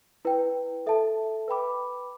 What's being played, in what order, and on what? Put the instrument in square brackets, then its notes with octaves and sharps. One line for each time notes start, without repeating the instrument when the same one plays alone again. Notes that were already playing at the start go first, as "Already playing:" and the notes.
[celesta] E4 B4 G5
A4 E5 A5
B4 G5 B5 D6